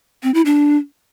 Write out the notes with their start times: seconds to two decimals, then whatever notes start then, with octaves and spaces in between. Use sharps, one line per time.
0.23 C4
0.34 E4
0.45 D4